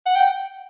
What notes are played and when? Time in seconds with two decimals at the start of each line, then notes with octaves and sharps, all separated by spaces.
0.06 F#5
0.16 G5